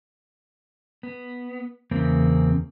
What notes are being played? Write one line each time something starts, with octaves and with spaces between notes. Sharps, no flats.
B3
E2 C#3 A#3 C4